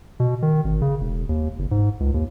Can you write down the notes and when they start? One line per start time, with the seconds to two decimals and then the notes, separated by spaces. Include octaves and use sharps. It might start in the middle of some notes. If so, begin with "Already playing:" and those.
0.20 B2
0.42 D#3
0.64 G#1
0.82 C#3
1.01 E1
1.29 D#2
1.59 F#1
1.71 G#2
2.00 C#2
2.14 D#2